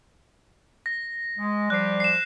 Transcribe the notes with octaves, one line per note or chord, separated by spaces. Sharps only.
A#6
G#3
F3 G3 F#6 C7
C7 E7